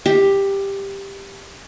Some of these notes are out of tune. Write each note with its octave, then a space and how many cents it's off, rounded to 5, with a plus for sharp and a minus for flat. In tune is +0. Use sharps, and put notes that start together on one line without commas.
G4 +10